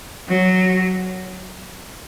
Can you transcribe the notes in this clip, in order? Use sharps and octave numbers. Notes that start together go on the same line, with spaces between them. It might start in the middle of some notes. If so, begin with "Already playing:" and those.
F#3